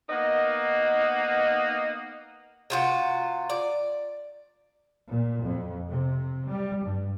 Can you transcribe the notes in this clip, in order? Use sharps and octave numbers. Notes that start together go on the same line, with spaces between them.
A#3 B3 D#4 D#5 F#5
C3 F4 F#4
D5
A#2
F2
C3
G3
G2